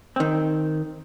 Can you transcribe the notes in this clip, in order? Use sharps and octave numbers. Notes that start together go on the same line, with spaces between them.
D#3 C4